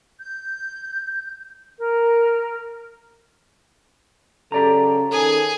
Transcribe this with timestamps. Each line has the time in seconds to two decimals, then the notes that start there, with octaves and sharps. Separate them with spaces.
0.20 G6
1.78 A#4
4.52 C#3 F#3 G4 A4 D5 A#5
5.11 D#3 C#4 G#4 A4 G#5